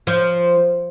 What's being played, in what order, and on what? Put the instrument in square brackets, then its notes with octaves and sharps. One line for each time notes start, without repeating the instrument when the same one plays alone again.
[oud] F3